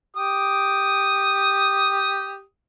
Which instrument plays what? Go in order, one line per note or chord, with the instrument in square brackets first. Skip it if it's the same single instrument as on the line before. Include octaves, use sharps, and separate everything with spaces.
[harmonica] G4 D#6